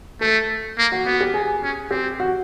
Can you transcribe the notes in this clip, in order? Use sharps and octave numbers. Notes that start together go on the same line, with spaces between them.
A3 A4
A#3
F#4
B3 F#4
G4
G#4
C#4
C4 G4
F#4